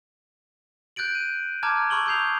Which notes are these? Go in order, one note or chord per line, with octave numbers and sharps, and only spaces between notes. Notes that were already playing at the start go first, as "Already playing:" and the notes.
F#6 G6 A6 D7 F#7
D#7
A5 A#5 D6 F6 G#6
B5 C#6 E6 F#7 G7
C#6 D#6 G6 C7 F7